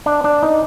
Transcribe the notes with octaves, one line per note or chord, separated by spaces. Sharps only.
D4
D4
D#4